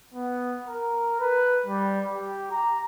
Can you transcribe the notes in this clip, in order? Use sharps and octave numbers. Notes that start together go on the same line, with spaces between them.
B3
A#4
B4
G3
G4
A#5